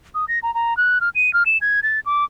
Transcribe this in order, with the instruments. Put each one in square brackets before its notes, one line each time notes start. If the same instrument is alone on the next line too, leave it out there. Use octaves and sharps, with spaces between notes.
[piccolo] D#6
A#6
A#5
A#5
F#6
F6
D#7
F6
E7
G#6
A6
D6